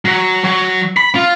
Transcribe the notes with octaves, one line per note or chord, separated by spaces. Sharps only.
F#3
F#3
B5
F4